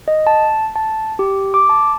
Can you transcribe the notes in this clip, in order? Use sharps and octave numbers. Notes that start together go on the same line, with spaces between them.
D#5
A5
A5
G4
D6
A5